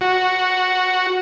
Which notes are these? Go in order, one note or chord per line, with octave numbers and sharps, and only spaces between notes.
F#4